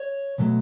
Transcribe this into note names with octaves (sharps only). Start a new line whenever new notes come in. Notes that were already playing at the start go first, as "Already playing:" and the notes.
Already playing: C#5
B2 F#3 A3